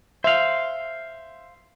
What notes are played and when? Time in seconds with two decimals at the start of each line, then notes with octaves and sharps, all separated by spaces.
0.24 C5 E5 F5